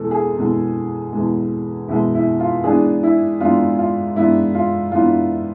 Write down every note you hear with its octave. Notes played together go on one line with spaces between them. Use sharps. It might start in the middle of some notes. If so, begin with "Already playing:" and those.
Already playing: E2 B2 G#3 A4
G#4
E2 B2 G#3
E2 B2 G#3
E2 B2 G#3 E4
E4
F4
G#2 E3 B3 D4 G#4
E4
G#2 E3 B3 D4 F4
F4
G#2 E3 B3 D4 E4
F4
G#2 E3 B3 D4 F4